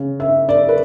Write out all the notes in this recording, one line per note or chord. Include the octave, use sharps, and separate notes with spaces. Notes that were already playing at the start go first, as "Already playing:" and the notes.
Already playing: C#3
E5
D5
B4